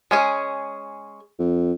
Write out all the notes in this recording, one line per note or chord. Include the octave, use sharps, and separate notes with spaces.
G#3 C#4 G#4
F2